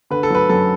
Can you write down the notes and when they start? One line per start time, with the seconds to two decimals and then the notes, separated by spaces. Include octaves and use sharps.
0.10 D3 B4
0.23 A4
0.30 F#3 B4
0.49 F#2 A4